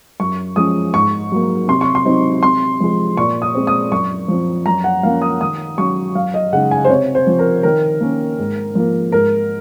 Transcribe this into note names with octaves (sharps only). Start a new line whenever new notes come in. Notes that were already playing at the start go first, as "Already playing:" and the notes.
F#2 C#6
F3 G#3 C#4 D#6
G#2 C#6
F#3 A#3
C3 C6
C#6
C6
F#3 C4 D#4
C3 C6
F3 G#3
A#2 C#6
D#6
G#3 C4
D#6
F#2 C#6
F3 C4
F#2 A#5
F#5
F3 A#3 C#4 F5
D#6
D#3 D#6
F#3 C#4 C#6
F#2 F5
D#5
C#3 G#3 D#4 F#5
G#5
C5
C3 C#5
C5
F3 C4
A#4
D#3 A#4
A#3 C#4
G#2
F3 A#3
G#2 A#4